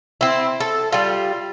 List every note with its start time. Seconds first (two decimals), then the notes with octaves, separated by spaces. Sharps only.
0.21 C4 E4
0.60 A4
0.92 G3 F4